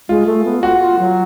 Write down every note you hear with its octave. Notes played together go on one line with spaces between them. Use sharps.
G#3 F4
A3
B3
F4 F#4
F4
F#3